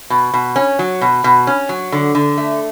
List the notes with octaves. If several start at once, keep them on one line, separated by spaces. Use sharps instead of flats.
B2
B2
C#4
F#3
B2
B2
C#4
F#3
D3
D3
A3